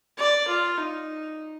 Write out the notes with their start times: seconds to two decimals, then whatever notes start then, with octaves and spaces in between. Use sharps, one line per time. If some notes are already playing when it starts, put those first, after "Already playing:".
0.17 D5
0.48 F4
0.78 D#4